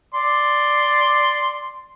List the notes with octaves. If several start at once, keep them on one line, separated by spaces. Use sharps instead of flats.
D5 C6